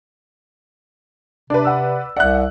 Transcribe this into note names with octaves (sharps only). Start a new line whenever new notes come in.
C3 D4 B4 D5
F#5 E6
C2 D5 E5 F#5 F#6